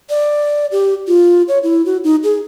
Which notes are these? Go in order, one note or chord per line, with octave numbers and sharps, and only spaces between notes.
D5
G4
F4
C#5
E4
F#4
D#4
G#4